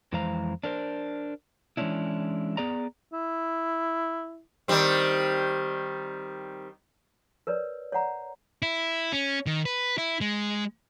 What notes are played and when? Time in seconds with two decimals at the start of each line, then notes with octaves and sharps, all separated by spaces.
0.13 F2 E3 G#3 C5 F5 A#5
0.64 D4 A#4 C5
1.77 E3 G#3 B3 C#4 D4 E4
2.57 B3 G#4 D5 A#5
3.13 E4
4.68 D#3 G3 C4
7.47 A#4 B4 C#5 D5
7.92 C#5 D5 F#5 A#5
8.62 E4
9.12 C#4
9.46 D#3
9.66 B4
9.98 E4
10.21 G#3